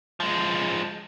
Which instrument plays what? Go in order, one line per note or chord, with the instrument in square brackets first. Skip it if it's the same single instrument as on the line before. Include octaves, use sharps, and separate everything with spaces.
[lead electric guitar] F3 G#3